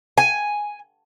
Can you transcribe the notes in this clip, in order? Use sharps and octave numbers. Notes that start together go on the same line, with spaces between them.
G#5